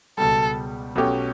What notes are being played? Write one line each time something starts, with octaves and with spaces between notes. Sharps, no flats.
C#2 B2 G3 A4
B1 B2 A3 C#4 G4